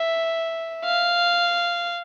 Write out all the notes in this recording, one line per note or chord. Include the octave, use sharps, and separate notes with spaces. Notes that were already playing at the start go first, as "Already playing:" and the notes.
Already playing: E5
F5